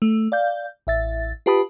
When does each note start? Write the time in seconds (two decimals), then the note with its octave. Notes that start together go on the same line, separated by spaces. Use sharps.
0.02 A3
0.32 D5 F5 G6
0.87 A1 E5 A6
1.46 F4 G4 B4 A5 B5 D#6